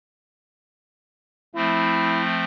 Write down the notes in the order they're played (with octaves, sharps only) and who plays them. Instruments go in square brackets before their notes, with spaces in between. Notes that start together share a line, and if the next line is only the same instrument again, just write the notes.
[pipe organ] F3 A3 C4 [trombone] E4